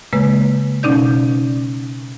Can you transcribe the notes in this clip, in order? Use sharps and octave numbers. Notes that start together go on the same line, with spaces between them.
C#3 G#3 A#3 B4
B2 C#4 D#4 D5 G6